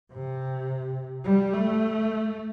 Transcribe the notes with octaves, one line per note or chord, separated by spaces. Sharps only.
C3
G3
A3